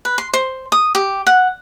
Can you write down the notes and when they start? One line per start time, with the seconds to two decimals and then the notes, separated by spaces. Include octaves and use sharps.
0.05 B4
0.18 C6
0.34 C5
0.72 D#6
0.95 G4
1.27 F#5